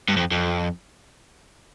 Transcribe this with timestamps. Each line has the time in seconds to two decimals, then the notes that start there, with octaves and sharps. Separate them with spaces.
0.09 G2
0.17 F2
0.31 F2